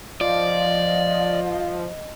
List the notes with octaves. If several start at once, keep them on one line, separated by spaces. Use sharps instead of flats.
F3 D5 D#5 F5